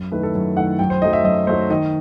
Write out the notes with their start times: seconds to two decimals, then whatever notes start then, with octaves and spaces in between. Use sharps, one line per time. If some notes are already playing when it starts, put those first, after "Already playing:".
Already playing: F#2
0.11 D#3 A3 E4 B4
0.23 A4
0.35 F#2
0.56 D#3 A3 E4 F#5
0.79 F#2 G5
0.90 C5
1.02 F#3 A3 D#4 D#5
1.13 E5
1.24 F#2 D#5
1.47 F#3 A3 D#4 C5
1.70 D#3 D#5